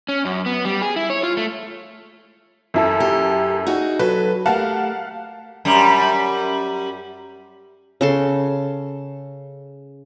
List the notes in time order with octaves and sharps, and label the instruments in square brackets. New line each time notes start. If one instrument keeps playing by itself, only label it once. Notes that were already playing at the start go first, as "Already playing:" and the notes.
[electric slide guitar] C#4
F#2
B3
G3
G#4
E4
C#5
F4
A3
[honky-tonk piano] F#2 E4 A4
[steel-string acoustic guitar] G4
D#4 F#4 G#4
[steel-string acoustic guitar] F#3 A4 [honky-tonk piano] B4
[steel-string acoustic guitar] A3 G4 A#4 [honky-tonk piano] F5 F#5 A5
[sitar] F#2 G3
[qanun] C#3 A4 C6